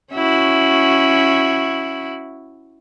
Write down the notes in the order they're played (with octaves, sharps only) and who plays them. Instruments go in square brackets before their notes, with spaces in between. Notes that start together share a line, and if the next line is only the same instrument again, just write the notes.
[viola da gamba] C#4 E4 F#4